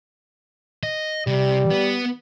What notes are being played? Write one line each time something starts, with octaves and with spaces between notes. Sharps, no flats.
D#5
C3 G3
B3